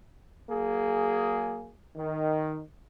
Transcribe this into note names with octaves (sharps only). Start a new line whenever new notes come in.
F#3 A#3 G#4
D#3